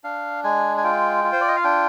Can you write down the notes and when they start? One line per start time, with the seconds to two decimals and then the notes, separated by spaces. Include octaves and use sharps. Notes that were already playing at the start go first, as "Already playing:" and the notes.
0.04 D4 F5
0.44 G#3 G#5
0.77 G#5
0.84 F4 G5
1.24 F4
1.32 C5
1.41 D5
1.48 D#5
1.56 F5
1.64 D4 G5